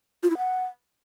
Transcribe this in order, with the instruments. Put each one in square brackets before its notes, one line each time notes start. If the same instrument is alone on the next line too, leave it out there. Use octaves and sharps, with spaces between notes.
[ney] F4
E4
F#5